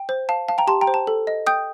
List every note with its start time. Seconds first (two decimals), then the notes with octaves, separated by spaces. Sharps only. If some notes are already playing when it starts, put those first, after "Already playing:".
Already playing: G5
0.09 C5
0.29 F5 A5
0.49 F5 A5
0.58 G5 A#5
0.67 G4 A5 C6
0.81 G5 A#5
0.87 C5
0.94 A5
1.07 A4
1.27 D#5
1.47 G5 D#6 G6